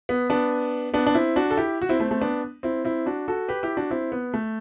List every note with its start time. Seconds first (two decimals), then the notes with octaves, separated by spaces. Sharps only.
0.09 B3
0.30 B3 D4
0.94 B3 D4
1.06 D4
1.15 C4 E4
1.36 D4 F#4
1.50 A4
1.57 E4 G4
1.82 F#4
1.89 C4 E4
1.99 A3 C4
2.11 A3 C4
2.21 B3 D4
2.63 C4 E4
2.85 C4 E4
3.06 D4 F#4
3.28 F#4 A4
3.48 G4 B4
3.63 E4 G4
3.77 D4 F#4
3.91 C4 E4
4.12 B3
4.34 A3